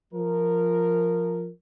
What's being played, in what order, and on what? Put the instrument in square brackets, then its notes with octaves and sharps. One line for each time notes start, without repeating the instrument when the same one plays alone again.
[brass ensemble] F3 A#4